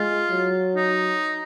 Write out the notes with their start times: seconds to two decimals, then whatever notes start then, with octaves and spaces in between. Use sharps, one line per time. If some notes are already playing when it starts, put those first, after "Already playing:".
Already playing: G#3 F4
0.30 F#3
0.76 D#4